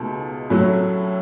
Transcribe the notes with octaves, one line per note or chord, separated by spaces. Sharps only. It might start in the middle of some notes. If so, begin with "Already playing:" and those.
Already playing: C#2 B2 A3 D#4
A2 F#3 A3 C#4 E4